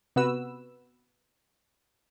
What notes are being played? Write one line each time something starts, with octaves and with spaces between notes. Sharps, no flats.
C3 B3 F#4 B4 E6